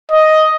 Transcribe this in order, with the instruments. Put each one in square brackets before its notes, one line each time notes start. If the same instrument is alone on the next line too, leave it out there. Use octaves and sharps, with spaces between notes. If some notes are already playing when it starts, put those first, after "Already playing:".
[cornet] D#5